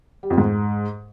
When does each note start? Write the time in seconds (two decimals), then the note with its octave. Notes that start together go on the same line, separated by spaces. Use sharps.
0.23 G3
0.30 F2
0.38 G#2